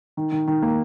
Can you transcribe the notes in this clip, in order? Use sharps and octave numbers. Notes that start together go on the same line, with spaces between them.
D#3
D#3
D#3
A#3